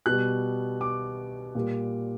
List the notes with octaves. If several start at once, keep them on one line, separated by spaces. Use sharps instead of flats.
B2 G3 F#6
D6
A#2 G3